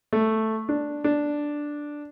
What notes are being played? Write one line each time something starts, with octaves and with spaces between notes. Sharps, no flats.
A3
D4
D4